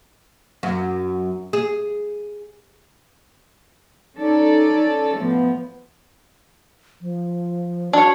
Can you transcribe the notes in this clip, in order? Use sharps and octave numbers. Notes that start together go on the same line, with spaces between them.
F#2
G#4
C#4 D#4 A4 D5
A2 F3 B3
F3
D4 F#4 C#5